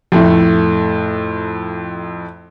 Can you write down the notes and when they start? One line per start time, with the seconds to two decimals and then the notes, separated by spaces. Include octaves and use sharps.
0.12 F2 A2 A3